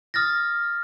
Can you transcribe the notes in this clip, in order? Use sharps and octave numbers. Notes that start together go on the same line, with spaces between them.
D#6 F6 A6 A#6